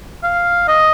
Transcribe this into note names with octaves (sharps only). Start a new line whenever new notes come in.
F5
D#5